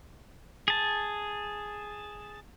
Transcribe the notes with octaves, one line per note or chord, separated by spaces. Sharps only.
G#4 A5